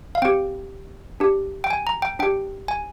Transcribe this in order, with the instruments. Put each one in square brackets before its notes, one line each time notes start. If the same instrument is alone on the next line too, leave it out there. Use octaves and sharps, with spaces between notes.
[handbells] F5
C4 G4 G5
D4 G4
G5
G#5
A#5
G5
D4 G4 G5
G#5